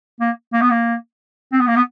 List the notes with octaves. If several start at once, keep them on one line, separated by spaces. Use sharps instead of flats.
A#3
A#3
B3
A#3
C4
B3
A#3
B3